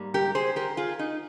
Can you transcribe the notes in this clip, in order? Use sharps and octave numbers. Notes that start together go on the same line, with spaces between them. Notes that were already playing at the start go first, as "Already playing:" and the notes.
Already playing: G#2 G3 A#3
G4 A#4
G#4 C5
G4 A#4
F4 G#4
D#4